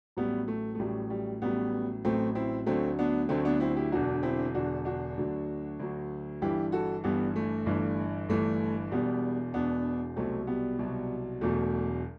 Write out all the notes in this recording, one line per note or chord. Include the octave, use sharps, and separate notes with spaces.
A1 A2 F#3 G3 B3
A3
A3
A1 A2 F#3 G3
G3
A1 A2 F#3 G3 B3
A1 A2 F#3 A3 C4
C4 E4
D2 D3 F#3 A3 C4
B3 D4
D2 D3 F#3 A3 C4
B3 D4
C4 E4
E4 G4
E1 E2 D3 F#3 D4 F#4
C4 E4
E1 E2 D3 F#3 D4 F#4
D4 F#4
D2 D3 F#3
D2 D3 F#3
G1 G2 E3 E4 G4
F#4 A4
G1 G2 E3 G3 B3
A3
G1 G2 E3
G1 G2 E3 A3
E1 E2 B2 G3 B3
E1 E2 B2 B3 D4
C2 B2 F#3 A3 C4
G3 B3
C2 B2 F#3
E1 E2 B2 F#3 A3